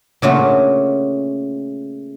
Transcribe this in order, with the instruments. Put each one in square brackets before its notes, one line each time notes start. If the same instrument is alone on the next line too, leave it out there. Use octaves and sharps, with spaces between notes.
[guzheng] A#2 C#3 A3 F#4